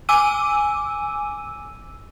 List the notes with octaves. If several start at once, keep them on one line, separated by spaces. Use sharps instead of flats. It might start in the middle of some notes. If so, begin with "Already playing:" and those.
G#5 D6 E6 D#7